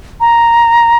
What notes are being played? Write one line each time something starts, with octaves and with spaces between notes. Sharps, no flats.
A#5